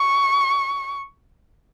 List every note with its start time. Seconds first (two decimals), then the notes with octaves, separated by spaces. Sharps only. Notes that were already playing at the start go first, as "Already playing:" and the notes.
Already playing: C#6